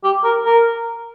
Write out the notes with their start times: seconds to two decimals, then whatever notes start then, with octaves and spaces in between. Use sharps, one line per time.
0.04 G4
0.24 A#4
0.45 A#4